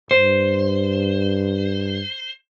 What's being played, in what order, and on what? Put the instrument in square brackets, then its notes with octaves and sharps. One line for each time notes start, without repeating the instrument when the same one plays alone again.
[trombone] G2 [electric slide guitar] C5